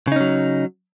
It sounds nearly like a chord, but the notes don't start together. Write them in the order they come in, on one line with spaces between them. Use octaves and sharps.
C#3 D#4 C#4 F#3